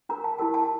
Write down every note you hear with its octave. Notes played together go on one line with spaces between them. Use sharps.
D4 G4 A#4 A#5
A5
E4 G4 A#4 A5
A5